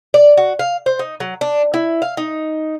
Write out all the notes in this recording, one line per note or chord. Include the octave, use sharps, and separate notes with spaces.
D5
F#4
F5
C5
D#4
F#3
D4
E4
F5
D#4